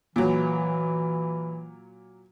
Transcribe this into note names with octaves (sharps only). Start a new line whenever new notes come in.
A#2 E3 F#3